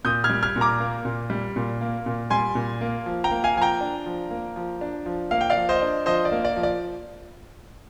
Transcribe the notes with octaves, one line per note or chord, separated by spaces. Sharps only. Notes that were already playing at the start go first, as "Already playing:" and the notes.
A#2 D#6 G6
F6 G#6
G3
F6 G#6
A#2
A#5 D6
A#3
A#2
G3
A#2
A#3
A#2
G3 G#5 C6
A#2
A#3
F3
G5 A#5
A#3
F5 G#5
F3 G#5
G5 A#5
D4
F3
A#3
F3
D4
F3
A#3 F5
G5
D5 F5
F3
C5 D#5
D4
F3 C5 D#5
D5
A#3
D5
F3
D5